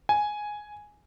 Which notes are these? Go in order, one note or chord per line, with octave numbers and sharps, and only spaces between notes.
G#5